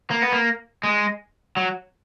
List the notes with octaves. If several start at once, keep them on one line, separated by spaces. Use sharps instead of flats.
A#3
B3
A#3
G#3
F#3